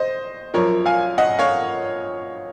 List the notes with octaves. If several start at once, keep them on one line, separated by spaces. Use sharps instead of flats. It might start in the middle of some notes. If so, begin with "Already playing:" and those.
Already playing: C5 D#5
F#2 F3 A#4 C#5
F5 G#5
D#5 F#5
C#5 F5